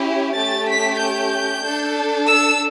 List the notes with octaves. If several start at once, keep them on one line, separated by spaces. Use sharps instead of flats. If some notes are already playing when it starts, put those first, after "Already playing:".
Already playing: C#4 E4 G4
A3 C#4 G4 A6
B6
G6
D4 A4
E6